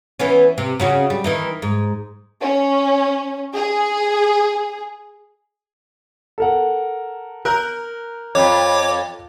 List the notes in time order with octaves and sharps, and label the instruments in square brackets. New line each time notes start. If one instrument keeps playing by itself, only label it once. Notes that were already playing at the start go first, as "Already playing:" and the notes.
[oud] E3 B3 C#4
C3
C#3 C#4 F#4
G3
D#3 E3 D#4
G#2
[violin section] C#4
G#4
[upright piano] A4 A#4 F#5
[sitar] A#4 [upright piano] A#5 F#6 G6
[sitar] F2 [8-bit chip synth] C#5 D6